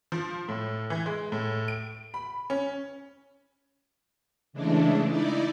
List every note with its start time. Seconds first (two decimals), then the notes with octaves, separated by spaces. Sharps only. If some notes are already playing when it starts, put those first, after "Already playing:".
0.12 F3
0.48 A2
0.90 E3
1.06 G#3
1.32 A2
1.68 D7
2.14 B5
2.50 C#4
4.53 C#3 E3 G#3 A3 D4
5.07 D#4 E4 D5